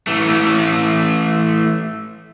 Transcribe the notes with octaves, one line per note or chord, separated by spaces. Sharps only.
E3 A3